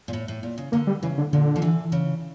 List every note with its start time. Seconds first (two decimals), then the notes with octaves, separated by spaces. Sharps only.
0.08 A#2
0.13 A2
0.28 A2
0.43 A#2
0.58 C#3
0.72 D3 A#3
0.87 G3
1.03 C#3 E3
1.18 D3
1.33 A#2 D3
1.56 F3
1.62 E3
1.92 C#3